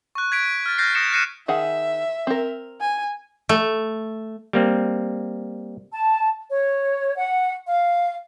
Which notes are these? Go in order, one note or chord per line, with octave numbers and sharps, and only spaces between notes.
C#6 F#6
G#6 B6 D7
F6 A6
F6 G6 A6 A#6 C7
D#6 A#6 C7 C#7 E7
F#6 A#6 C7 C#7 D#7 E7
D#3 G#4 E5 F#5
C4 A#4
G#5
A3
G3 A#3 C4
A5
C#5
F#5
F5